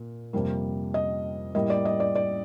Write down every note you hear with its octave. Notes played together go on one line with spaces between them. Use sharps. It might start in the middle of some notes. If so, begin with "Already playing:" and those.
Already playing: A#2
F2 C3 G3 A#3
D#5
A2 G3 A#3 D#5
D5
D#5
D5
D5